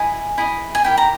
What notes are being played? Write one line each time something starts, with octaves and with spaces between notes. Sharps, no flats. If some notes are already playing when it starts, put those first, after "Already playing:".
Already playing: E4 G#4 D#5 G#5
E4 G#4 D#5
G#5
E4 G4 A#4 G5
A#5